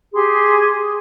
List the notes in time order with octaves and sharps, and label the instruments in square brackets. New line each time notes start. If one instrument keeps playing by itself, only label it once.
[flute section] G4 G#4 C6